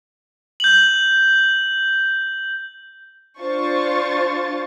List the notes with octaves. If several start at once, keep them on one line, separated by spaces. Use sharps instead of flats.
G6 F#7
D4 F4 C5 C#6 A6